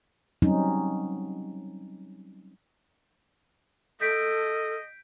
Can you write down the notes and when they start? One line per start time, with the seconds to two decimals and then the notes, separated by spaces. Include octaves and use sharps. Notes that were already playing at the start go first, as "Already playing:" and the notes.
0.42 F#3 G3 C4 C#4 D#4
4.01 A4 D#5 G6 B6 D7